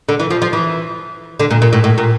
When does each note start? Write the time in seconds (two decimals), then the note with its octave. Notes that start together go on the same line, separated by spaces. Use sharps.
0.09 D3
0.19 E3
0.30 F3
0.42 F3
0.53 E3
1.40 D3
1.51 A#2
1.62 A#2
1.73 A2
1.84 A2
1.98 A#2